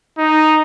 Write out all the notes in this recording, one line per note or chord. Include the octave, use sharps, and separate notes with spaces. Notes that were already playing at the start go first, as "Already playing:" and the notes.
D#4